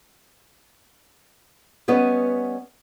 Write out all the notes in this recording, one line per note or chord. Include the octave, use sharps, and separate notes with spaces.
G3 B3 C#4 B4 D#5